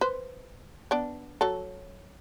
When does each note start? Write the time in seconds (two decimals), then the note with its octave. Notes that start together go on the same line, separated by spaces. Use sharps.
0.01 B4 C5
0.91 B3 D4
1.41 F#3 A4